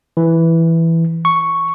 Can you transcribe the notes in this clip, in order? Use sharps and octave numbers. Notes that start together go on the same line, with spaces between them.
E3
C#6